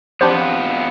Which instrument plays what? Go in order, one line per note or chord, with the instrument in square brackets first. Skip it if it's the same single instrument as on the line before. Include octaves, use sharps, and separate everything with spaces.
[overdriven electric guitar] F2 B3 [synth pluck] D4 G4 C5